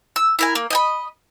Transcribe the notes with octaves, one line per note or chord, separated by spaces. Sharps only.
E6
E4 A#4 G#5
A#3
D#5 G5 B5